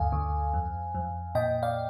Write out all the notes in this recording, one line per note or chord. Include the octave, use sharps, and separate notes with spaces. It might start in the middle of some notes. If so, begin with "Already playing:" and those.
Already playing: D2 G2 F5 G#5
D2
F2
F2
A#2 D#5 G5
D5 F5